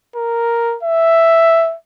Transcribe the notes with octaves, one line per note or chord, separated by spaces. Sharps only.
A#4
E5